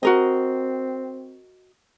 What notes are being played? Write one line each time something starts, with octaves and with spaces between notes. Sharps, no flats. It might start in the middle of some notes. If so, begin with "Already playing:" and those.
C4 F#4 A#4 D#5